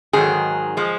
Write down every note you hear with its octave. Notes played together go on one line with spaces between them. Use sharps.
G#2 D#3 F#3 G#4
F3 G#3